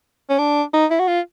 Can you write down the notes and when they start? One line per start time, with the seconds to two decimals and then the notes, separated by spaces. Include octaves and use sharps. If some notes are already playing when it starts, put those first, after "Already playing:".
0.29 C#4
0.38 D4
0.73 D#4
0.90 E4
0.99 F#4
1.08 F4